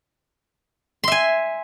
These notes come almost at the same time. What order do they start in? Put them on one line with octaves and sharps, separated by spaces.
C6 E5 G#5